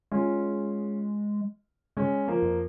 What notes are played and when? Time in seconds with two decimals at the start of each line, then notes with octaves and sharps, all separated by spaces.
0.12 G#3 C#4 F4
1.97 G#3 C#4
2.28 F3 A#3
2.43 F2